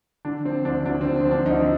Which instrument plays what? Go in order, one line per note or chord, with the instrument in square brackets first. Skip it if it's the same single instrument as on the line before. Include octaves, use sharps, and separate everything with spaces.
[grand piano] D3 D4
F3 C4
D2 D4
D2 D4
C4
D3
C4
F3
D4
D2 D#4